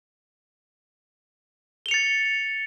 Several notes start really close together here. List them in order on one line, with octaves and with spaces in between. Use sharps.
G7 F7 C#7 A6